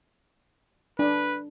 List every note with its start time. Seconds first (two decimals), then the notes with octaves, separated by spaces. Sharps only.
0.99 D4 B4